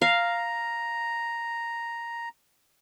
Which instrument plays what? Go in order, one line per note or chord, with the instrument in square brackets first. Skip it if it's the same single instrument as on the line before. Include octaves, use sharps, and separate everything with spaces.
[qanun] F5 [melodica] A#5